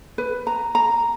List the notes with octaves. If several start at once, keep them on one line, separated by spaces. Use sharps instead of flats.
B4
A#5
A#5